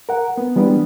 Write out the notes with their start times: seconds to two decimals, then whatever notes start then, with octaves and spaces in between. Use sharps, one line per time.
0.09 A#4 F#5
0.38 B3
0.56 E3 G3 G#3 B3 D4